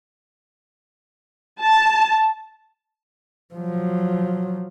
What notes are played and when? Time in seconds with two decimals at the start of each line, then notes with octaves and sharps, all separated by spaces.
1.61 A5
3.54 F3 F#3